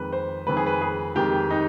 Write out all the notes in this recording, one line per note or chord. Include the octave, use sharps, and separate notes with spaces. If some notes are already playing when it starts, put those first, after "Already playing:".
Already playing: F2 D#3 G#3 B4
C5
F2 D#3 G#3 B4
G#4
B4
G#4
F2 D#3 G#3 G4
D#4